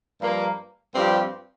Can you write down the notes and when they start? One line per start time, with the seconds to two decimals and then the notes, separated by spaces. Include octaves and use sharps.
0.21 G2 F3 A#3
0.94 G2 F3 C4 G4